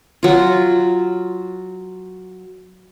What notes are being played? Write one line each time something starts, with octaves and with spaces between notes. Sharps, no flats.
F#3 F4